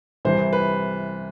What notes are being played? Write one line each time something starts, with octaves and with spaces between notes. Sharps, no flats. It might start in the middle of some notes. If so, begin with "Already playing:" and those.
C2 C3 E3 C5
B4